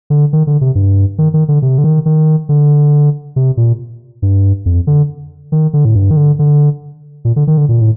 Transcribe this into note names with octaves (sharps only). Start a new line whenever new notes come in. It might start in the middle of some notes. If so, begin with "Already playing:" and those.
D3
D#3
D3
C3
G2
D#3
D#3
D3
C3
D3
D#3
D#3
D3
C3
A#2
G2
F2
D3
D#3
D3
A2
G2
D#3
D3
D3
A#2
D3
D#3
D3
A#2
A2